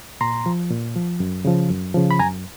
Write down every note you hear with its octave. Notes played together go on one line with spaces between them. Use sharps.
A#2 A#5 C6
F3
A#2
F3
F#2
C#3 F3
F#2
C#3 F3
B5
F#2 G#5 A#5